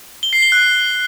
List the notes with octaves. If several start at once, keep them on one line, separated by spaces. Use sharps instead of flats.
G7
C7
G7
F#6